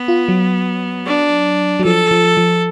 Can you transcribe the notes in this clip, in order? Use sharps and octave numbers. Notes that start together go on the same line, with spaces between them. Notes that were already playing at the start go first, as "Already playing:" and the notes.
Already playing: B3
F4
F#3
D4
F#3
F3 A4
F3
F3